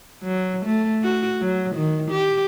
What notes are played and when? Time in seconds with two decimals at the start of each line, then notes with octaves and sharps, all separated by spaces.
0.23 F#3
0.66 A3
1.03 F#4
1.41 F#3
1.75 D#3
2.11 G4